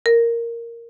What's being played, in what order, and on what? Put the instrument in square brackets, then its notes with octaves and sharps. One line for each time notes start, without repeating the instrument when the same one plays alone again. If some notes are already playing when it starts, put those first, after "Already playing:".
[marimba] A#4